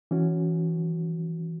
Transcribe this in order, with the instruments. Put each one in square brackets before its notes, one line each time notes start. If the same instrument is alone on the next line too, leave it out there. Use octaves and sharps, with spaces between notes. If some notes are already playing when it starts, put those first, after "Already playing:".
[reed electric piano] E3 C#4 F#4